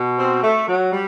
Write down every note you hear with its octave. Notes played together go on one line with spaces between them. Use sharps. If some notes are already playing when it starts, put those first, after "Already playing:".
Already playing: B2
C4
A3
F#3
G3